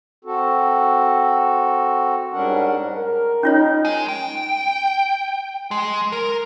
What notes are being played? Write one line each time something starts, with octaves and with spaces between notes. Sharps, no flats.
C4 F#4 A4
G#2 G3 C#4 D4 A#4 F#5
A#4
C#4 D#4 F4 C#5
G#3
G5
G#3
A#4